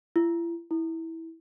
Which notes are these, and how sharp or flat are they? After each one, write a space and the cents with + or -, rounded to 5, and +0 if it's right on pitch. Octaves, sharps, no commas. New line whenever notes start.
E4 +40
E4 -15